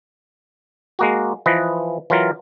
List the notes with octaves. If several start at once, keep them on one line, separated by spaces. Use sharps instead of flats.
G#3 A#3 F#4
E3 F3 B4 D#5
E3 F#3 F4 A#4